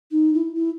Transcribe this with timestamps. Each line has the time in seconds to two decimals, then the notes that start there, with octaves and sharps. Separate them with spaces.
0.11 D#4
0.34 E4
0.55 E4